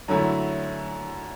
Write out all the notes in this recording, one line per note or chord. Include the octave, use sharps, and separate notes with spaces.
F#2 D3 F#3 A3 E4